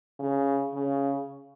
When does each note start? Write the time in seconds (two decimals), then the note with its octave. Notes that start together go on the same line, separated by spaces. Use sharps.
0.20 C#3
0.75 C#3